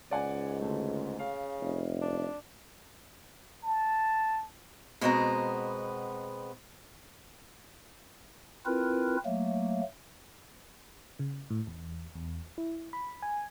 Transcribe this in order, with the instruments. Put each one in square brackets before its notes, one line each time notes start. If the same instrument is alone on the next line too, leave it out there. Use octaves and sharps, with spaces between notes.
[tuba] C#2 [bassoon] G#2 [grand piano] D5 F#5 G#5
[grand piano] D2 A3
[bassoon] C#3 [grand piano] F5
[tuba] F1
[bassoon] D4
[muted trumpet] A5
[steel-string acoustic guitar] B2 G#3 B3 C4 D#5 A#5
[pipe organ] C4 E4 F4 A#4 B4
F#3 A3 A#3
[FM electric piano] C#3
A2
E2
E2
E4
B5
G#5